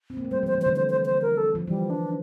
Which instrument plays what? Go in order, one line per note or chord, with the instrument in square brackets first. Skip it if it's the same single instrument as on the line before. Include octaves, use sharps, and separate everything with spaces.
[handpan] C4
A#3
A3
[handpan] G3 [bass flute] C5
[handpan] F3
[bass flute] C5
[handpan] E3
[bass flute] C5
[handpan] D3
[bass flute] C5
C5
C5
A#4
A4
[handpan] F3
[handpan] E3 [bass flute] G3
[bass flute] D4